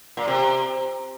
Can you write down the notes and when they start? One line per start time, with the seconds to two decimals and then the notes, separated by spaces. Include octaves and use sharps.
0.17 A#2
0.28 C3